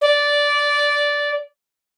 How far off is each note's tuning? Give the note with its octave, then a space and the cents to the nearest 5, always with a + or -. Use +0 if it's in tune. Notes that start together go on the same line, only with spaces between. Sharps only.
D5 -10